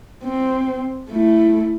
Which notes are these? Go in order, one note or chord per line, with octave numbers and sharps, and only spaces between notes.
C4
A3 E4